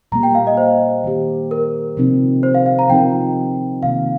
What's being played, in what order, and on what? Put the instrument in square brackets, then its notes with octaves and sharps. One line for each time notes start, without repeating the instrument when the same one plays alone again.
[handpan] A#2 G3 A#3 [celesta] A#5
[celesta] G5
F5
D#5
C5
[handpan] D#3 A#3 G4
[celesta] A#4
[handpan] C3 F3 C4 D#4
[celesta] C5
F5
F5
A#5
[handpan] F3 C4 D#4 A#4 [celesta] G5
[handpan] C3 D#3 A#3 [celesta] F5